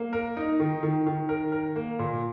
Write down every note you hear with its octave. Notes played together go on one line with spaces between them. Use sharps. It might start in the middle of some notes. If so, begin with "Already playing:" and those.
Already playing: A#3
A#4
D#4
D#3
D#3
D#3
A#4
A#4
A#3
A#2